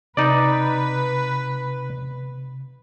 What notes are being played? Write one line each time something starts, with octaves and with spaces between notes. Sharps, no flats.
C3 D#4 B4 D5